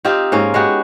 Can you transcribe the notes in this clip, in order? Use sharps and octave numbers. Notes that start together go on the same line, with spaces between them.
C4 D#4 F4 G4
G#2 A#3 C#4
G#3 B3 F#4 G4